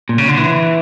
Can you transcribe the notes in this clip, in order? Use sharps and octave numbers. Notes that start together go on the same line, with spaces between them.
A#2
C#3
D3
E3